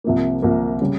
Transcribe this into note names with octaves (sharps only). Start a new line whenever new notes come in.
C2 C3 F3 A#3
C2 C3 F3 A#3
C#3 G3